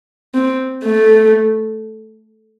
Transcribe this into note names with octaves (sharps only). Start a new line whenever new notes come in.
C4
A3